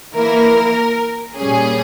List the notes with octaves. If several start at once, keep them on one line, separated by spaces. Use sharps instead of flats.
E3 A#3 E4 A#4
A#2 G3 C#4 G#4